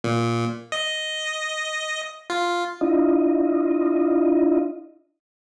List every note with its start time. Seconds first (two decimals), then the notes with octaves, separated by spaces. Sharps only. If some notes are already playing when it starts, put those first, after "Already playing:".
0.04 A#2
0.72 D#5
2.30 F4
2.81 D4 E4 F4 D#5